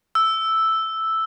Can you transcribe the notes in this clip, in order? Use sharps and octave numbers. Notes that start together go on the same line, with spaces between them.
E6